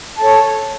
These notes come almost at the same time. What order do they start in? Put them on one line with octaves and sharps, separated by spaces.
A5 A4 C#5